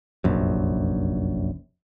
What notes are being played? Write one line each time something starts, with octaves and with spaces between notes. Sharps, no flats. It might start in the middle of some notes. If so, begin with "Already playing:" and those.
F1 A#1 F#2